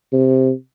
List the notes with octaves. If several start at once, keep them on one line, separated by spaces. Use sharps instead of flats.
C3